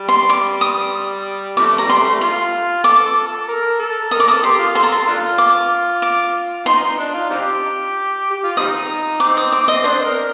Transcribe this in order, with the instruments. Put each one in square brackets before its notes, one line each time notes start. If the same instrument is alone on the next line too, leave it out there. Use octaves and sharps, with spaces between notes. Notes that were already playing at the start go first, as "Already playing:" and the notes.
Already playing: [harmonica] G3
[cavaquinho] C6
D6
D#6
[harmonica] C3 F3 A3 [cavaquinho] D6
[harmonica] G3 [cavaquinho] A#5
[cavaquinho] C6
[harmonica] A3
[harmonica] F4 [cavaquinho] C6
[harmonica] A4 [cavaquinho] D6
[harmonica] A4
A4
A#4
A4
[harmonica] A#4 [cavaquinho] D#6
[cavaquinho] D6
[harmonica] A4 [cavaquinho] D#6
[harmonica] G4 [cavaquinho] C6
[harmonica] F4
[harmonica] A4 [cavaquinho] C6
[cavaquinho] A#5
C6
[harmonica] A#3 D4 F4
[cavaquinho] D6
D6
[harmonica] D#4 [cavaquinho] C6
[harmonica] D#4
D4
F4
C4 D#4 G4
G4
F4
[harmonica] G3 C4 D#4 [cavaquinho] D#6
[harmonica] C4 [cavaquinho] D6
[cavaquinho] D#6
D6
D#5
[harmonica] D4 [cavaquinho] C5
[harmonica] A#4